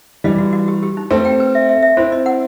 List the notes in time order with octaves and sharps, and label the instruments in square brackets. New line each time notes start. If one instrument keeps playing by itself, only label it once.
[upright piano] E3 G3 [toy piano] D#5
[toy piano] F#4
F#4
G4
G4
D#4
[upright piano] A3 C4 [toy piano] B4
[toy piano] G5
B4
E5
E5
E5
[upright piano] C4 E4 [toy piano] C5
[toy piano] D#5
F#5